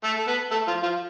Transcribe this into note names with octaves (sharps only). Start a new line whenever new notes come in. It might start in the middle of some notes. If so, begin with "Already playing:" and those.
A3 A4
A4
B3 B4
A3 A4
F3 F4
F3 F4